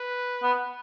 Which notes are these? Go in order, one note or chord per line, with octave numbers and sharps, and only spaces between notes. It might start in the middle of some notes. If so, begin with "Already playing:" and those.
Already playing: B4
B3